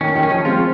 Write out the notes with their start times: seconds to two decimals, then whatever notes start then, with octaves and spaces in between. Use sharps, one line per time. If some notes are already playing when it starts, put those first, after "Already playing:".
0.01 D#3 C#4
0.15 D#3
0.23 C#4
0.31 F3
0.45 G#3 C4 F4